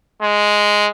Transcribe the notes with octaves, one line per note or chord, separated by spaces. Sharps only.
G#3